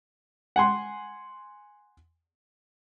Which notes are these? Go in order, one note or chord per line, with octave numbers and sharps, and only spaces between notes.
F#5 G#5 C6